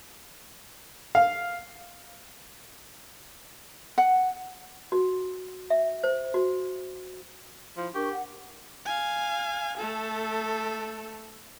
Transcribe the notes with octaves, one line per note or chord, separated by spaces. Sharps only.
F5
F#5
F#4
E5
C5
F#4
F3 E4
D4 G4 A#4 C#6
F#5
F5 G#5
A3 A4